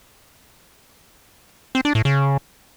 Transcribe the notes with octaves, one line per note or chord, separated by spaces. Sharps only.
C4
D4
A2
C#3